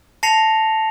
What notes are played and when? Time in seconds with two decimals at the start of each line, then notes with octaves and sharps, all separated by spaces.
0.23 A5 A#6 C7 C#7 F7